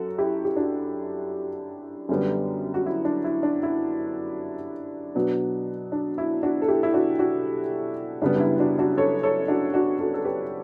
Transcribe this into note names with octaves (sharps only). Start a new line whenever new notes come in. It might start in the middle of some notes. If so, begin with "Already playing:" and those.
Already playing: F#2 F#4 A4
E4 G4
G4
D4 F#4
F#2 D3 G3 B3
F#4
E4
D4
E4
D4
E4
B2 F#3 B3 D4
D4
E4
D4 F#4
A4
E4 G4
E4
D4 F#4
D4 F#4
F#2 C#3 G3 B3 D4
D4
E4
D4 F#4
D4 F#4
A4 C#5
A4 C#5
D4 F#4
D4 F#4
F#4 A4
A4
G4 B4